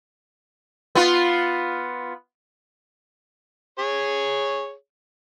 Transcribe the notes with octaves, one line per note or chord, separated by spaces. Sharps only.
B3 F4
G#4 C#5